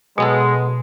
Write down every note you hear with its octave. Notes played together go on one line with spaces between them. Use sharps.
B2 F#3 G#3 B3 A4